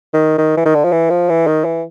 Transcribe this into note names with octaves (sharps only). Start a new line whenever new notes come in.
D#3
D#3
E3
D#3
D3
F3
E3
F3
E3
D#3
E3